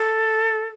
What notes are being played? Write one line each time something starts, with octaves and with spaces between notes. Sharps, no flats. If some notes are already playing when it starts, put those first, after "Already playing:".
Already playing: A4